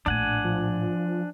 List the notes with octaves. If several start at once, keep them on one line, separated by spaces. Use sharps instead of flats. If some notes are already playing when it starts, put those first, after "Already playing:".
A#1 A2 D4 F#5 G#5
F3